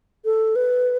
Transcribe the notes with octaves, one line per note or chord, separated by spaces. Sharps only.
A4
B4